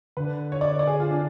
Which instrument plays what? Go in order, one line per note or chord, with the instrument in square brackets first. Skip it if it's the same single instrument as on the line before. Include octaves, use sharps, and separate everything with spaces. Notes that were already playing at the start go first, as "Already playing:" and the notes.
[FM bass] D3 [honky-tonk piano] B4
[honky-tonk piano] C#5
D5
D5
G#4
F4
D4